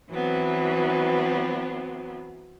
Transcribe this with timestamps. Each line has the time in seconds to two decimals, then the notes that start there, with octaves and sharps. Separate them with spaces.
0.12 E3 F#3 B3 C4